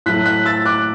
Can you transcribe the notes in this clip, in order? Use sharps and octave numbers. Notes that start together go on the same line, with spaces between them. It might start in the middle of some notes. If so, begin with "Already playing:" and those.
A2 F#3 A3 F#6 B6
F#6 B6
E6 A6
D6 F#6